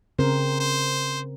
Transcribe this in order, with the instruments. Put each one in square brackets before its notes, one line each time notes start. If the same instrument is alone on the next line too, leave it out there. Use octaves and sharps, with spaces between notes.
[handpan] C#3 C4 A#4 [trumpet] C5
[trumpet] C5